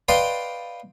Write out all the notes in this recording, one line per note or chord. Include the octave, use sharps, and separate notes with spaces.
B4 D5 D#5 F5 G5 C6